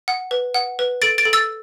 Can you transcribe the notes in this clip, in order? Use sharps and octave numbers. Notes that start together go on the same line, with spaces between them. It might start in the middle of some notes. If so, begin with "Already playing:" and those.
F#5
B4
F#5
B4
A4 A6 D7
A6 D7
A4
E6 A6